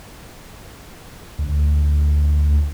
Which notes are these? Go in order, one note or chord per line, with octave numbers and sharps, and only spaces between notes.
D2